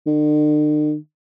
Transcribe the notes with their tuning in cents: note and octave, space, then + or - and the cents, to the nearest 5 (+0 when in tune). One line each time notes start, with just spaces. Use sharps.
D3 +45